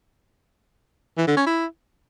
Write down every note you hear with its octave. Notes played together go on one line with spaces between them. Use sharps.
E3
D3
C#4
E4